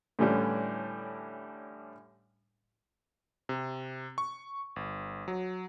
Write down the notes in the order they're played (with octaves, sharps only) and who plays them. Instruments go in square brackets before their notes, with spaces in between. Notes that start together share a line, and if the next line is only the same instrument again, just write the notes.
[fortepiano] A2 D3 E3 G3 C#4 D4
[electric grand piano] C3
C#6
G1
F#3